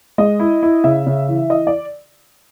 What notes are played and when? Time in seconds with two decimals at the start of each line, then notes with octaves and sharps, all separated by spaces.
0.18 G#3 D#5
0.40 E4
0.63 E4
0.84 C#3 E5
1.07 C#3
1.29 E3
1.49 E3 D#5
1.67 D5